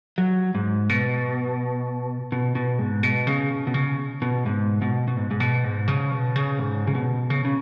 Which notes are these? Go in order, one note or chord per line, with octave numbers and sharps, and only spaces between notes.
F#3
G#2
B2
B2
B2
G#2
B2
C#3
B2
C#3
B2
G#2
B2
B2
G#2
G#2
B2
G#2
C#3
B2
C#3
G#2
C#3
B2
C#3
C#3